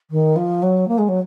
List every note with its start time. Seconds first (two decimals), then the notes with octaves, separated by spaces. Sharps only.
0.10 D#3
0.36 F3
0.62 F#3
0.88 A#3
0.98 G#3
1.08 F#3